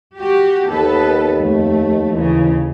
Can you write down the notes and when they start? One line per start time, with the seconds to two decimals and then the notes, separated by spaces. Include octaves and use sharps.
0.18 F#4 G4
0.69 D#2 B3 A4 B4
1.39 F2 A3
2.12 D#2 C#3 E3